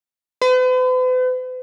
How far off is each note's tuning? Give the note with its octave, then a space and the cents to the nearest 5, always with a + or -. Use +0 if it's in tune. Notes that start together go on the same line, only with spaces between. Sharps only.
B4 +45